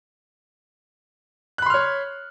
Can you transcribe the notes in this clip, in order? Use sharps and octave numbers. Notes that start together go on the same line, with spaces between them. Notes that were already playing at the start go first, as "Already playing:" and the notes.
C#5 B5 C6 F6 F#6